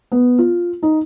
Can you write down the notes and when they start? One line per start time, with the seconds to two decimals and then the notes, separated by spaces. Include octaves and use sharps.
0.12 B3
0.39 F4
0.83 D#4